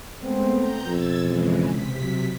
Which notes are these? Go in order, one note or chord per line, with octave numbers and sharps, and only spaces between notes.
G#3 A3 B3 C4
A#5 G6
F2 B2 E6 G#6 A6
C#3 E3 G#3
C3 B6
F#3